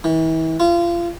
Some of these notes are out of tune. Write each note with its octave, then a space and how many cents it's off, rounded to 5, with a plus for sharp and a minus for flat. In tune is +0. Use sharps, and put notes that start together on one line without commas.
E3 -35
F4 -30